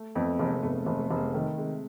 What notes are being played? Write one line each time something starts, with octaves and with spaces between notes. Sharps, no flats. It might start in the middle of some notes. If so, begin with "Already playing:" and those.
Already playing: A3
F2 A3 B3
F1 G#3 A#3
F1 A3 B3
F1
A3
F1
G#3 A#3
D#3 A3
C3 G#3